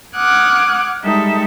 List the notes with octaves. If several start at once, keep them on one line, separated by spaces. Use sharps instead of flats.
F#5 D6 D#6 F6 F#6 G#6
G3 G#3 D#4 A4 E5